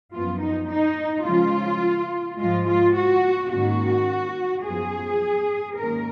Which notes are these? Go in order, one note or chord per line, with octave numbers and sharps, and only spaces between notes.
F#2 F3 B3 F4
D#4
D#4
C#3 F3 G#3 C#4 F4
G#2 F3 G#3 F4
F4
F#4
G#2 D#3 A#3 C#4 F#4
F#2 F3 B3 G#4
G#2 D#3 A#3 C#4 A#4